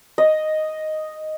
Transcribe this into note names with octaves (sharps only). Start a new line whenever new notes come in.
D#5